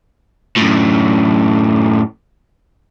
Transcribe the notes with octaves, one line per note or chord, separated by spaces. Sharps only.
F#2 A2